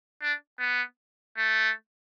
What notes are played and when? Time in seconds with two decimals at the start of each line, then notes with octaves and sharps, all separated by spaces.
0.22 D4
0.59 B3
1.37 A3